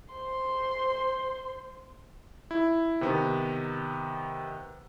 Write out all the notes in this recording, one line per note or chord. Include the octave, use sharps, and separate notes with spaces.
C5 C6
E4
C3 D#3 B3